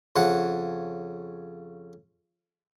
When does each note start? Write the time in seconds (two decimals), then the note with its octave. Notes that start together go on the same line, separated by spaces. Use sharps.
0.16 F2 C#3 F#5 A5